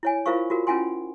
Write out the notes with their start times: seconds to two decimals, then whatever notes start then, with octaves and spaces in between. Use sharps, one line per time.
0.03 E4 C#5 G#5
0.26 E4 F4 A#4 C5 F5 C#6
0.50 F4 F#4 A#4
0.67 C#4 E4 F4 F#5 G#5 C6